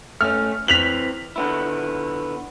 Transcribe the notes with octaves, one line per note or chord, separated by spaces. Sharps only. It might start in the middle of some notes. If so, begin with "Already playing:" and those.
A3 C#4 F6
E3 C4 B6 F7 F#7
D3 B3 E4